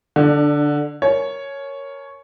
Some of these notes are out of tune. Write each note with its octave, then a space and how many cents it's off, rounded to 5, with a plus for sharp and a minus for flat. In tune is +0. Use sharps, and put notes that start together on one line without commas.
D3 +0 D4 +30
A#4 +0 C#5 +0 G#5 +45